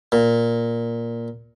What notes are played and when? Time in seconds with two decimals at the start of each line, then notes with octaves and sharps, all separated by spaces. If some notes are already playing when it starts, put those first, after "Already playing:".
0.12 A#2